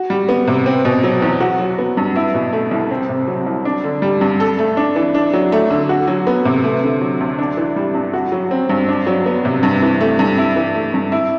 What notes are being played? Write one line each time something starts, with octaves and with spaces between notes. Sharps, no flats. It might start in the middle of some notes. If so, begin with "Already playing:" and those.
Already playing: F#4
G3
B3
C3
C4
B2
F#3
E2
F#4
F#3
B3
G2
E4
B2
A3
C2
C4
C3
F#3
C2
D4
D3
G3
G2
A4
A3
D4
E3
D4
F#3
A3
D3
F#4
F#3
B3
C3
A3
D3
F#3
D2
D4
E3
G3
G2
F#4
F#3
C4
G2
D4
F#3
B3
C3
G2
E3
A3
G2
E4
E3
A3
G2
E4